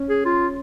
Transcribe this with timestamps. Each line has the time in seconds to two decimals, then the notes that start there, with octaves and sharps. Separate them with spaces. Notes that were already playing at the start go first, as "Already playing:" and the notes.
Already playing: C#4
0.09 G#4
0.26 F4